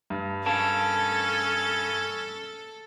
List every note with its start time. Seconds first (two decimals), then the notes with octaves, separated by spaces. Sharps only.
0.10 G2
0.46 C#4 A4 A#4 F5 A5